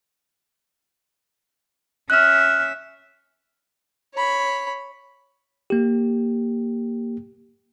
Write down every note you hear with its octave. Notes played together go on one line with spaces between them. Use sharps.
C#4 E5 F6 F#6
C#5 B5
A#3 G4